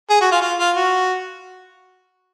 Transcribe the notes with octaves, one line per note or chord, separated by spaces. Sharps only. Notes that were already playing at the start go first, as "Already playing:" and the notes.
G#4
F#4
F4
F4
F4
F#4